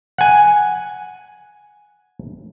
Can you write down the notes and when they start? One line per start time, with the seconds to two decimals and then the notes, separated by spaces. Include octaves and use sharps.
0.18 F#5 G#5